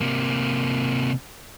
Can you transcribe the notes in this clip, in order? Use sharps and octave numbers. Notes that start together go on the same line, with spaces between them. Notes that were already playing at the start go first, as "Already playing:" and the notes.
C3 A#3